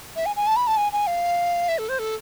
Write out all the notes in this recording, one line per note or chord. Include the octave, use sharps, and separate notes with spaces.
E5
G#5
G#5
A5
B5
A5
G#5
G#5
F5
E5
A4
C5
A4